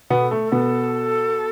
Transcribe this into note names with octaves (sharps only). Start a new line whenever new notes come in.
B2 B3
A4
A3
A4
B2 B3